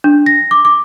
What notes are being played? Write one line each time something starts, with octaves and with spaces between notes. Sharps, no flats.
D4
A#6
D6
D6